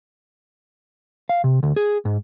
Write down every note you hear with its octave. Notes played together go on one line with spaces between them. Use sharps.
F5
C3
D2
G#4
G#2